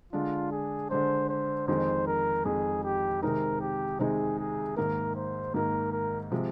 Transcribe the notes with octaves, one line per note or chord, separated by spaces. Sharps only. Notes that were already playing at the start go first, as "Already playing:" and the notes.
D3 G#3 D4 F4
G#4
D3 G#3 D4 C5
C5
F2 D#3 G#3 C5
A#4
F2 D#3 G#3 G#4
G4
C3 D#3 G#3 C4 D#4 A#4
G4
C3 D#3 G#3 C4 D#4 G#4
G#4
G#2 D#3 A#3 A#4
C5
G#2 D#3 A#3 A#4
A#4
C3 F3 G#3